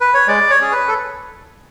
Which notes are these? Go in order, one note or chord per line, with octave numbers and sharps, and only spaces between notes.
B4
C#5
G#3 D5
C#5
C#4 G#4
B4
A4